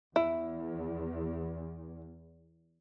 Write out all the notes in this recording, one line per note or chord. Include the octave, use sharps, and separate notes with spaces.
E2 E4